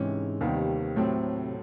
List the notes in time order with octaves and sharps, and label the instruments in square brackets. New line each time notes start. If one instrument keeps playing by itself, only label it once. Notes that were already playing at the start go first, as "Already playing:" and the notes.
Already playing: [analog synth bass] G#2 [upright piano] C3 E3 G#3 C#4
[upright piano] D#2 D#3 G3 B3 [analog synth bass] C3
[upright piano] A2 F#3 A3 C4